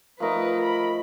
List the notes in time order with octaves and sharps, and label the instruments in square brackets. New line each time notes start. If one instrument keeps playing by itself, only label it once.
[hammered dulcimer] F3 A3 D#4 [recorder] A#4 [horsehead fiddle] B4
[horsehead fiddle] B5